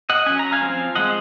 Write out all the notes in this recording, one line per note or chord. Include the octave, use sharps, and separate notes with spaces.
D#5 F#5
F#3 C#4 G#5
A#5
F5 G#5
F3 G#3 C4
F3 G#3 C4 D#5 F#5